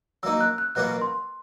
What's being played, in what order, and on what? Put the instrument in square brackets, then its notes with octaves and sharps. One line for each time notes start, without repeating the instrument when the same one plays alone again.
[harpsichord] F#3 [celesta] E6
[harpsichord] A#3 D#4
[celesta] F#6
F#6
[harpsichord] B2 F#3 A#3 C#4 F4 [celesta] F#6
[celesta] C6